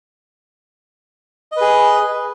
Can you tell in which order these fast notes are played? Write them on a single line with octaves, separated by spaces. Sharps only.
D#5 B4 G#4